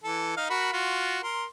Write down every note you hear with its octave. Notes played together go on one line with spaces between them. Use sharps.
E3 A4
D#4 F5
F#4 A#4 B5
F4 F#4
A#4 C6